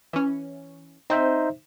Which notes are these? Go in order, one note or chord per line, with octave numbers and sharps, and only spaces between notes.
E3 C#4
C4 D#4 C5 E5